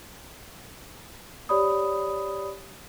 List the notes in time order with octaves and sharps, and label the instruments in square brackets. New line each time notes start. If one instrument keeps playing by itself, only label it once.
[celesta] G4 C#5 D5 B5 D#6